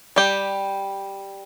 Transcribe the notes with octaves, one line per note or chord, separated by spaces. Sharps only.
G3 G4